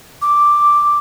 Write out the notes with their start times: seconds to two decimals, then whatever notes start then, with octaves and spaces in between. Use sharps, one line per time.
0.22 D6